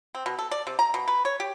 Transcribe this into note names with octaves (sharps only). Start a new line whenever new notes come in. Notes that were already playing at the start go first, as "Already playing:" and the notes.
C4
B2
A4
D5
C3
A#5
B2
B4
C#5
G4